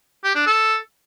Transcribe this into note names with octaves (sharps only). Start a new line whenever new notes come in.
G4
D4
A4